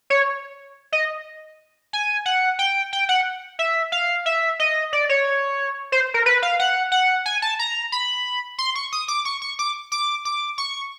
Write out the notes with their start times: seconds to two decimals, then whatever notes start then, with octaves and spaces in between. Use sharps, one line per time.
0.10 C#5
0.92 D#5
1.93 G#5
2.25 F#5
2.59 G5
2.93 G5
3.09 F#5
3.59 E5
3.92 F5
4.26 E5
4.59 D#5
4.93 D5
5.09 C#5
5.92 C5
6.14 A#4
6.26 B4
6.43 F5
6.59 F#5
6.92 F#5
7.26 G#5
7.42 A5
7.59 A#5
7.92 B5
8.58 C6
8.75 C#6
8.92 D#6
9.08 D6
9.25 C#6
9.42 C#6
9.59 D6
9.92 D6
10.25 D6
10.58 C#6